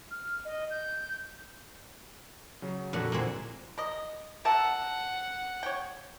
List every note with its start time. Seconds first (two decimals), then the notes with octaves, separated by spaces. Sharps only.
0.11 F6
0.45 D#5
0.70 G6
2.62 C#3 F#3 C#5
2.93 F2 A#2 D3 G#3 F#4 F#5
3.12 A#2 G#3 C4 E4 C#7
3.78 A#4 D#5
4.45 A#4 E5 F#5 A5
5.63 C#5 G5